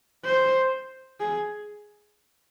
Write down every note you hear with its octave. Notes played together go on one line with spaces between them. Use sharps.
C5
G#4